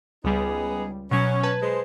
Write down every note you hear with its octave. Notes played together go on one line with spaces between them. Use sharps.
C#2 G3 B3 D#4 G#4
B2 F#3 C#4
B4 A5 G#6
G#3 C5